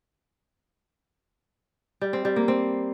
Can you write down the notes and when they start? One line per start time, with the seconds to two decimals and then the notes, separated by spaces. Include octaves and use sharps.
2.01 G3
2.13 C4
2.25 G3
2.36 A#3
2.48 C4